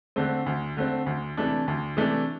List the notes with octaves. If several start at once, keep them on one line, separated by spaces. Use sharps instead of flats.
D3 A3 C4
D2
D3 A3 C4
D2
C3 E3 A3 D4
D2
C3 E3 A3 D4